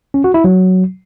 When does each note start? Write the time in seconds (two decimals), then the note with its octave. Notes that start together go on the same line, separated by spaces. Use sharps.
0.14 C#4
0.24 F#4
0.34 E4
0.44 F#3